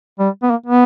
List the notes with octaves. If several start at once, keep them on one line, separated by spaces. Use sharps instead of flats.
G3
B3
A#3
B3